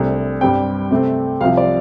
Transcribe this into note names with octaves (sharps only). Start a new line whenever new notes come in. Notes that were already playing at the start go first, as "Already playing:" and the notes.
Already playing: C2 C3 A3 D4
G2 G3 C4 G5
C3 A3 C4
C2 C3 F3 F5
D5